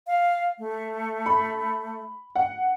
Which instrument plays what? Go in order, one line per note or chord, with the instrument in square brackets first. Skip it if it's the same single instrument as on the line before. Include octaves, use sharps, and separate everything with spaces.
[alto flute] F5
A3
[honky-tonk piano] B5
F#5